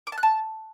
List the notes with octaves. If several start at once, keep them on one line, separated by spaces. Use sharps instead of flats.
D6
A5
F#6
A5